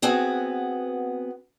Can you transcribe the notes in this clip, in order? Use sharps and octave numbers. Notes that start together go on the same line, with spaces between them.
B3 C4 F#4 G#4